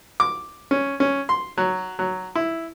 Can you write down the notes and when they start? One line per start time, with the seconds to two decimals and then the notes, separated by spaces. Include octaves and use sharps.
0.20 D6
0.71 C#4
1.00 C#4
1.29 C6
1.57 F#3
1.99 F#3
2.36 E4